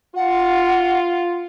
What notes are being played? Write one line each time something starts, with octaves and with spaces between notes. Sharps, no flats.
F4 F#5